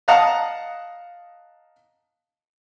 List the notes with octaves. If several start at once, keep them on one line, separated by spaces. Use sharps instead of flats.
D#5 F5 F#5 A5 A#5 D#6